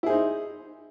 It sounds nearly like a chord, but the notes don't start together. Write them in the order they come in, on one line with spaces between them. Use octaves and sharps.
E4 G#4 C5 D#4